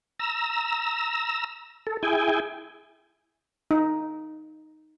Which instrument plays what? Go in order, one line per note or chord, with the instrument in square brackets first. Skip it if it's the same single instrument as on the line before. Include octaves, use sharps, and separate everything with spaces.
[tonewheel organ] A#5 E6
A4
E4 G#4 G5 G#5
[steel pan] D#4